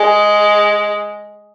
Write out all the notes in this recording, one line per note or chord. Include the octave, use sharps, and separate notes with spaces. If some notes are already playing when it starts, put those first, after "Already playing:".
Already playing: G#3